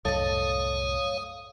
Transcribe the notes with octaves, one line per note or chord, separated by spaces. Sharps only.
C2 F#2 A2 A4 C#5 D#5 F5 D#6